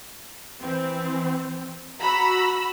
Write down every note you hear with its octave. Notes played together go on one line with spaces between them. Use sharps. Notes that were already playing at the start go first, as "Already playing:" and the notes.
E3 C4
F#4 A#5 B5 E6